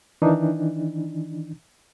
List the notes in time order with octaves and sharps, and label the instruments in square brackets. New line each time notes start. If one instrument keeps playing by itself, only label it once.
[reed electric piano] D#3 E3 D4 D#4